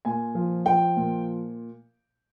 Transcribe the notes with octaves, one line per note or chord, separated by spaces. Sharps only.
A#2 G#5
F3
F3 G5
A#2